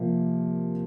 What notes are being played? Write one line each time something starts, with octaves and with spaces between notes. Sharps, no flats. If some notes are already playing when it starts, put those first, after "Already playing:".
Already playing: C3 F3 A#3